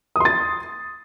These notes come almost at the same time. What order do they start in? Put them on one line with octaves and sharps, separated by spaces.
D#6 C6 A6